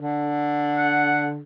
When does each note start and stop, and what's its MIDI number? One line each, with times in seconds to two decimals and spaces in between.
0.01 1.41 50
0.78 1.28 78